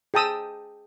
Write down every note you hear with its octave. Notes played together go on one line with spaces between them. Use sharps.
G#4 G5 A5 D#6 E6